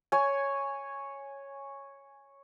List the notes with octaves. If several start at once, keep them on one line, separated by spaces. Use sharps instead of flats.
C#5 G#5